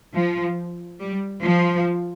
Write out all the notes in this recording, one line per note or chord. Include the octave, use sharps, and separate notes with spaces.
F3
G3
F3